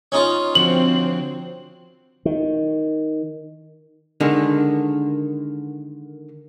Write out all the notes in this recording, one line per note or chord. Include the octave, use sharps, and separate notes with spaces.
C#4 D#4 F4
D3 F3 C4 F#4 F#7
D#3
D3 D#3 G#3